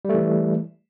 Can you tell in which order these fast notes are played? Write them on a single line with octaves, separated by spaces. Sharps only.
G3 A3 E3